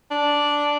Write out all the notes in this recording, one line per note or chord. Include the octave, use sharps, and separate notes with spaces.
D4